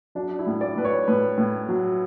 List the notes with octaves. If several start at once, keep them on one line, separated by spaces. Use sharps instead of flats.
F#3 D4
E4
A2
D5
A2 B4
C#5
A2 B4
A2
F#3